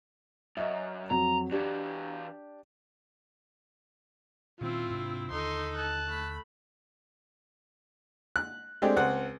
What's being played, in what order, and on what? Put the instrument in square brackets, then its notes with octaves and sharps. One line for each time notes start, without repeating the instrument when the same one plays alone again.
[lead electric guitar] F#2 [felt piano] D#5 E5
[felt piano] F2 F#3 [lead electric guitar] A#5
[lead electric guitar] E3 F#4 [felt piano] D4 G4
[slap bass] A#2 D#3 C#4 [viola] C4 E4 [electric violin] F4
[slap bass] G#2 C3 D4
[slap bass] D#2 D3 [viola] D#4 A4 [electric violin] C6
[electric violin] A5 F#6
[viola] A3 B5
[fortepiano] F#6
G#3 A3 C4 D4 G4
C#2 C4 F#5